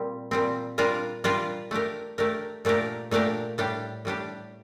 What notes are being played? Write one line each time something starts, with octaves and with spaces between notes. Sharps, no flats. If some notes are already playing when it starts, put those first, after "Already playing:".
Already playing: A#2 G3 C4
A#2 G3 C4
G3 D4 F4 A#4
G3 D4 F4 A#4
A3 D4 G4 A#4
A3 D4 G4 A#4
A#2 A3 D4 G4 A#4
A#2 A3 D4 G4 A#4
A2 G3 D4 G4
A2 G3 D4 G4